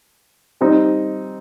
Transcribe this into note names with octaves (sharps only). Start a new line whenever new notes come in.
G3 C4 D#4